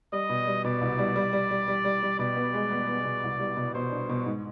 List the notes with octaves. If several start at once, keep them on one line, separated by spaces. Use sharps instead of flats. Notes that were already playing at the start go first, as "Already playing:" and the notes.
G3 D#5
B2
G3
B2 D5
C2
G3
G3
G3
G3
G3
G3
G3
B2 D5
B3
G#3
B3
B3
B2
C2
G3
B2
B2 C5
D4
B2
G#2